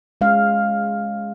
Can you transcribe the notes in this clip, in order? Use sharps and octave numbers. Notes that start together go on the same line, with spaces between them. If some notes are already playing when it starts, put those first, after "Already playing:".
G#3 C#4 F5